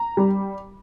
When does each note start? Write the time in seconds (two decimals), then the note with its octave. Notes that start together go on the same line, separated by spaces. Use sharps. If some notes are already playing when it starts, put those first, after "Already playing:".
Already playing: A#5
0.17 G3